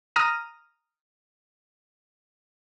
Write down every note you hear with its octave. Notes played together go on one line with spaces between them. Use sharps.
A#5 D#6 F6 A#6 D#7